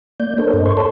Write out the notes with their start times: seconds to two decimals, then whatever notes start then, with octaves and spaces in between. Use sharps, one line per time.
0.20 A#3 D5 G6
0.38 D4 A4 A#4 C5 C#5
0.54 G2 D#5
0.66 C5 C6 C#6
0.77 A4 C#5 A5 C6